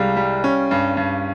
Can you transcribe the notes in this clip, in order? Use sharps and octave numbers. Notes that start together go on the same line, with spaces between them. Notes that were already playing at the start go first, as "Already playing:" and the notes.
Already playing: C2 G3 G#3 F5
G3
C#4
G2
G2